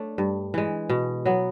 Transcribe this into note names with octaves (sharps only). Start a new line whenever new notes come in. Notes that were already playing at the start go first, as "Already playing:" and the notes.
Already playing: A3 D4 C#5
G2
E3 G#3
B2
F#3 B3